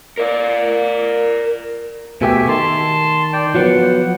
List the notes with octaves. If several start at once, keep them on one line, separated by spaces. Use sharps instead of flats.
A#4 D5
B2 A3 G4 E5 G#5
D#3 A5 C6
D5 G5
F3 F#3 B3 F#5